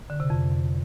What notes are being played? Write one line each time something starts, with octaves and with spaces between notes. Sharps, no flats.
D3
C3
F2